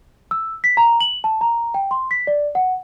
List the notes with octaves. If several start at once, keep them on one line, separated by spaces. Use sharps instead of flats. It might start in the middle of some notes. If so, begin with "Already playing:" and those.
E6
B6
A#5
F#7
A5
A#5
G5
C6
B6
D5
F#5